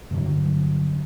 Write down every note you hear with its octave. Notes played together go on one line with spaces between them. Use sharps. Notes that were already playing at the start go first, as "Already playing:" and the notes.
G2 D3 F#3